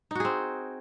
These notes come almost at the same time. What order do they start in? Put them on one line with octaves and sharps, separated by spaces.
D#4 F#4 G#4 C4